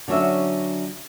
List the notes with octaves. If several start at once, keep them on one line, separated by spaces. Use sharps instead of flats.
D3 F#3 C#4 E5